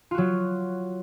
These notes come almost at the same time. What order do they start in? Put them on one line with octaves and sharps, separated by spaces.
F4 F#4 F#3